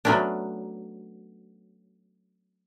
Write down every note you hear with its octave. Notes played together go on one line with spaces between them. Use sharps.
F#3 A3 B3 C#4 D4